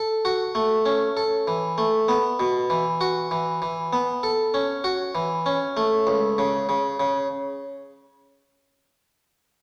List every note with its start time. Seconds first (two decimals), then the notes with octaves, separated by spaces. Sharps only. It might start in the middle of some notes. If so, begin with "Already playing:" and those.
Already playing: A4
0.25 F#4
0.55 A3
0.86 C#4
1.17 A4
1.47 E3
1.78 A3
2.08 B3
2.40 B2
2.70 E3
3.01 F#4
3.31 E3
3.62 E3
3.93 B3
4.23 A4
4.54 C#4
4.84 F#4
5.15 E3
5.46 C#4
5.77 A3
6.07 C#2
6.38 C#3
6.69 C#3
7.00 C#3